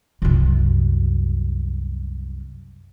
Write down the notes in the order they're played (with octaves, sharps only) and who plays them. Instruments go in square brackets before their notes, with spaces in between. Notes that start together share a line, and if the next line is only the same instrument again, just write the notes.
[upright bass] C2 F#2